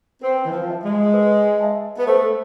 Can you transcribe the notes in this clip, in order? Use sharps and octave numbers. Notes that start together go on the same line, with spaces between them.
C4 B4
E3
F3
E5 A5
G#3
B4
E5 A5
B3
A3 C5